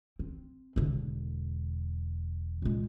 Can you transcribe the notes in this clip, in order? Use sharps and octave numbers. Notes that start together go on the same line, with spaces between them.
C4
E1 D3
A#2 G#3